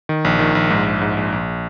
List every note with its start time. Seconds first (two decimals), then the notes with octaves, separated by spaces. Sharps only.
0.09 D#3
0.25 A#1
0.39 D#3
0.55 A#1
0.70 G#2
0.86 A#1
1.01 G#2
1.17 A#1
1.32 A#1